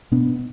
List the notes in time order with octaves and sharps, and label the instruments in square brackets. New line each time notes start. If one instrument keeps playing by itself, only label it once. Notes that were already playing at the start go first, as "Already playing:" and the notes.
[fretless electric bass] B2 B3 D4